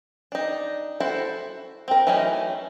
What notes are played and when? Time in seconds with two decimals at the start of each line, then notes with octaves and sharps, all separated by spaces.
0.32 D4 D#4
1.00 E4 F#4 A4 C5
1.88 C4 A#4
2.07 E3 F#3 A3 C#4 D#4